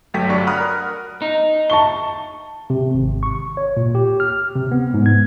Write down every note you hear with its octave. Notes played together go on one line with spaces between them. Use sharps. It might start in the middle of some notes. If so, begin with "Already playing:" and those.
G1 F#3 A3 G5 B6
G2 F#3 D4 D5 C#6 C#7
F#5 A#5 B5 D#6 F6 F#6
A#4
D#4
A5 C#6 G7
C3
G#1
C#6
C#5
A#2
G4
F6
C3
B3
G#2
G#6